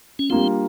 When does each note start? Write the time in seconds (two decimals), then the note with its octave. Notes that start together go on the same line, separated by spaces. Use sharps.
0.19 C#4
0.30 G3 A#3 C4 D4 F4